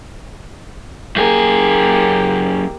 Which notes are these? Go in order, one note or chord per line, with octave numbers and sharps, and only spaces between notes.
F#2 A#3 G4 G#4